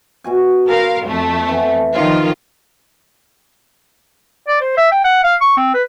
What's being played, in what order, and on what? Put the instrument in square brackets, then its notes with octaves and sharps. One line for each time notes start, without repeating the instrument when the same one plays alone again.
[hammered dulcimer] B2 F#4 G#5
[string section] A#4 F5 [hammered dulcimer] G#5 B5 C6
[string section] F2 A3
[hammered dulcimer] E3 B3
[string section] D#3 F3 F4
[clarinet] D5
C5
E5
G5
F#5
F5
C#6
C4
B4